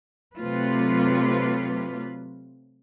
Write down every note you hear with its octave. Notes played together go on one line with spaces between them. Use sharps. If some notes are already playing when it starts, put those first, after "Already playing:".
C3 F#3 A3 F4 B4